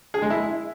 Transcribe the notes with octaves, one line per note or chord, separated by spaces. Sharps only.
G#4
G#3
E4